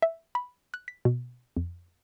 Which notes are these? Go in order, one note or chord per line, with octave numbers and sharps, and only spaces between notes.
E5
B5
F#6
B6
B2
F2